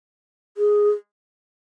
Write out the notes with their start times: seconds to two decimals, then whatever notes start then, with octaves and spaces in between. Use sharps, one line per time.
0.57 G#4